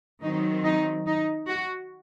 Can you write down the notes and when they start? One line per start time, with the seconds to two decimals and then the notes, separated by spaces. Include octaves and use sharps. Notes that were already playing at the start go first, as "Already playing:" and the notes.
0.22 D#3 F#3 C4 D#4
0.64 D#4
1.06 D#4
1.48 F#4